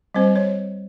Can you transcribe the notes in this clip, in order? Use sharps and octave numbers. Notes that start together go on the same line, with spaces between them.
G3 C4 C5
C#5